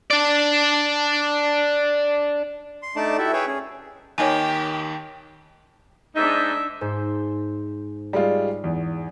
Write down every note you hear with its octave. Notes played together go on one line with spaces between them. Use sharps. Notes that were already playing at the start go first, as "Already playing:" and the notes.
D4 D5
C6
A3 D4 D#4 D5 A5
E4 F#4 G4 A4 E5
G#4 B4 C#5 E5 G5
C#4 G#4
D#2 D#3 G4 C#5 D#5 G#5
G#2 D4 D#4 E5
G#2 C5
G3 G#3 F4
E2